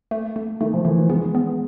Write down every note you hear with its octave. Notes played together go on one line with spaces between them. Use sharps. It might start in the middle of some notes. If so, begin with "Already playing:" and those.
A3
A3
D#3 A3
F3
E3 A3
D#3
G#3 B3
B3